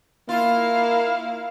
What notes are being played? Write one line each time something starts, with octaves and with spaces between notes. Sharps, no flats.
A#3 E4 F4 F5